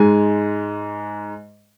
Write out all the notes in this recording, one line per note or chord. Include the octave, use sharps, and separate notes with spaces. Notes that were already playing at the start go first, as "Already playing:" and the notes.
Already playing: G#2 G#3 G#5